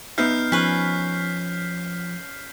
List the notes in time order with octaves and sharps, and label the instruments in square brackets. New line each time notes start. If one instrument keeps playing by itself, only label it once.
[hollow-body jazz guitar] B3 D#4 E5 [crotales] F6 G6 C7
[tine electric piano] F3 [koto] C#4 B4 [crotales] B6